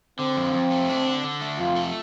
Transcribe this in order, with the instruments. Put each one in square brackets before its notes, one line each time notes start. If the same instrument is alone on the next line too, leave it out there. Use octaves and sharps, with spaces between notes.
[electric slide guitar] D3 [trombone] C4
[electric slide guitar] F2
F2
A3
D4
D3
D3
A3
[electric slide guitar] F2 [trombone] F4
[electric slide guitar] A3